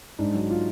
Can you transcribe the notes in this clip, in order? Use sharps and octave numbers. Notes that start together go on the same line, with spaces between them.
G#2 D4
F#3
F4